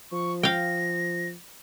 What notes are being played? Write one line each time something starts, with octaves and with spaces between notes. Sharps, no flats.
F3 C#6
F5 G5 A#6